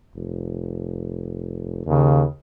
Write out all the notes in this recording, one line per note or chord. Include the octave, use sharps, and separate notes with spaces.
F1
D#2 C#3